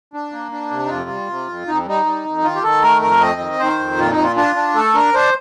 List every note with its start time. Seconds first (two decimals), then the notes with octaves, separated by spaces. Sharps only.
0.14 D4
0.32 A#3
0.52 D4
0.71 C3
0.86 D#4
0.90 F2 F4
1.09 G3
1.29 C3
1.48 F2
1.67 F2 D#4
1.87 G3 D#4
2.06 G3
2.25 F2
2.44 D#3 F4
2.55 G4
2.63 D#3 A4
2.82 A3 A#4
3.02 F2 A#4
3.21 C4 D#5
3.40 D#3
3.59 D#3 C5
3.79 F2
3.98 A#2 F4
4.11 D#4
4.18 A#2
4.23 F4
4.36 D4 F4
4.56 D4
4.75 A3 A4
4.95 D4 A#4
5.14 D4 C5